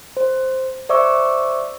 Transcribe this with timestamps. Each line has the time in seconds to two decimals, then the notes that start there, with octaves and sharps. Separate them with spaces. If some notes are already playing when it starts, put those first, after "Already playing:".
0.17 C5
0.89 C5 D5 E5 C#6 D6 E6